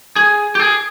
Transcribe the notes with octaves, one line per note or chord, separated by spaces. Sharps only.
G#4
G4
G#4